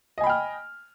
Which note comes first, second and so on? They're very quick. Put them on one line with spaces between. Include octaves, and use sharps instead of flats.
D#5 G#5 B5 G5 F6